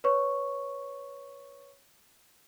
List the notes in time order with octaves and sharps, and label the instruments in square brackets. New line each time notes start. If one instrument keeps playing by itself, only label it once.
[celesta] B4 C#5 C#6